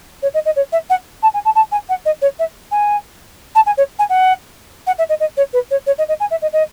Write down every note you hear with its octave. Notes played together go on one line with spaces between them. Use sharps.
C#5
D#5
D#5
C#5
E5
F#5
A5
G#5
A5
A5
G#5
F#5
D#5
C#5
E5
G#5
A5
G#5
C#5
G#5
F#5
F#5
E5
D#5
D#5
C#5
B4
C#5
C#5
D#5
D#5
G#5
E5
D#5
D#5